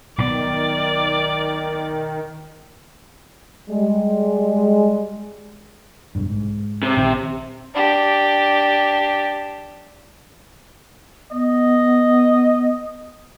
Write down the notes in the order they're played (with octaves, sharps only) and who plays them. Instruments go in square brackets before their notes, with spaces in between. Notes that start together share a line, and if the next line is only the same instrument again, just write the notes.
[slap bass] B1 B2 B3 [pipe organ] D#3 [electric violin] D5
[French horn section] G3 G#3
[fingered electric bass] F1 B1 G2
G#2
[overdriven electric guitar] C3
[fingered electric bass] A#1 D#3
[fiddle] D4 G4
[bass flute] B3 [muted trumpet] D#5